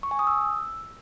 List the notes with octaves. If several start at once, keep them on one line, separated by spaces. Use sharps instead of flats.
C#6
G#5
D#6
E6